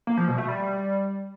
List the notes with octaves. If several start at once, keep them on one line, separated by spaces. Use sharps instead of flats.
A#3
F3
B2
A3
G3